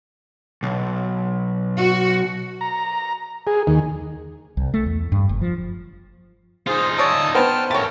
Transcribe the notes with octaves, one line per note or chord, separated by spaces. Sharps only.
B1
F#4
A#5
G#4
D#2
C2
A3
E2
G2
F#1
F3
D#4 F4 G#4 C5
G#3 C#5 D5 A5 D#6 E6
B3 C5 G5 A5 B5 F6
C#3 A3 A#4 C#5 G5 A5